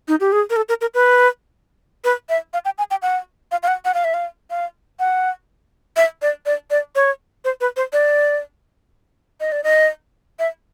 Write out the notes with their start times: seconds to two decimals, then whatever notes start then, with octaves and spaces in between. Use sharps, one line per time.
0.08 D#4
0.20 G4
0.32 G#4
0.50 A#4
0.56 A4
0.69 A#4
0.81 A#4
0.94 B4
2.04 B4
2.29 E5
2.54 F5
2.65 G5
2.78 G#5
2.91 G5
3.02 F#5
3.52 F5
3.63 F5
3.68 F#5
3.85 F#5
3.94 F5
4.04 E5
4.14 F5
4.50 F5
4.99 F#5
5.97 E5
6.22 D5
6.46 D5
6.71 D5
6.95 C#5
7.45 C5
7.61 B4
7.76 C5
7.93 D5
9.40 D#5
9.52 D5
9.64 D#5
10.39 E5